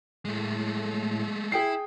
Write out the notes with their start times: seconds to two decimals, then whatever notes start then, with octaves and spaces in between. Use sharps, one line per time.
0.25 A2 G#3 A3
1.52 E4 G#4 G5 C7